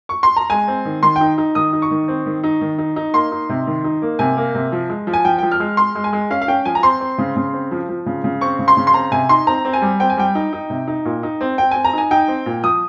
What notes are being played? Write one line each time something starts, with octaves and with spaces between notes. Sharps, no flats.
C#6
C6
A#5
G#3 G#5
C4
D#3
D#3 C6
D#4 G5
D#4
D#3 D#6
D#4
C#6
D#3
C4
D#3
D#4
D#3
D#4
D#4
A#3 C6
D#4
C3
D#3
D#4
A#3
C3 G#5
A#3
C3
F3
G#3
F3
G#5
F3 G5
F3 G5
F6
G#3
G#3 C6
G#3
G#5
G#3
C#4 F5
F5
C#4 G5
F3 G#5
A#5
C4 C6
C4
C#3
C#3
C4
F3
F3
C#3
C#3
C4 C#6
C#3
C6
C#3
C6
C4 A#5
C3 G#5
D#4 C6
C4 A#5
C4
G#5
G3
C4 G5
G#5
G3 G5
D#4
D#4
C3
D#4
A#2
D#4
C4
C4 G5
C4 G#5
A#5
D#4 G#5
D#4 G5
C4
A#2
F3 D#6